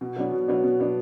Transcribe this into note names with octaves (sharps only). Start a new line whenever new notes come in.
B2
F#3 B3 D4
B2
F#3 B3 D4
B2
F#3 B3 D4